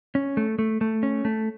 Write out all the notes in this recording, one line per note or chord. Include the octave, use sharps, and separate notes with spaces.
C#4
A3
A3
A3
C#4
A3